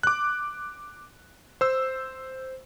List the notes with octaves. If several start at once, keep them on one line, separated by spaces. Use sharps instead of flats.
D6 F#6
C5 E6